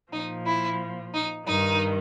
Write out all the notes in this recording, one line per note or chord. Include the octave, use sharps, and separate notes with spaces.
A#2 F3 D#4
E4
D#4
G2 D#3 D#4